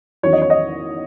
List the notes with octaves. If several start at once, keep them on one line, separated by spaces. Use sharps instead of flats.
E2 D#3 F#3 C#4 C#5
D#5
C#5
D#5